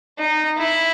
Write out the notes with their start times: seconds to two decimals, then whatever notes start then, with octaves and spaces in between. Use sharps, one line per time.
0.19 D#4
0.58 E4